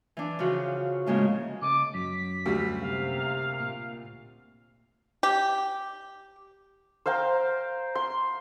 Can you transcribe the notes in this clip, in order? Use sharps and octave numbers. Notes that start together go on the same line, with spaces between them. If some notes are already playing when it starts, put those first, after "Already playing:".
E3 D4
C#3 F3 F#4
A2 C#3 G#3 A#3
C#3 A4 D#5 D6
F#2 F#3 B6
D2 G3
C3 A#3 F5
A#2
G4
C5 F5 G5 A#5
C6